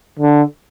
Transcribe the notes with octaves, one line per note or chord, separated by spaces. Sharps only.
D3